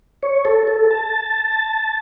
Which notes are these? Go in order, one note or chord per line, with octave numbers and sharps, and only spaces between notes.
C#5
A4
A4
A5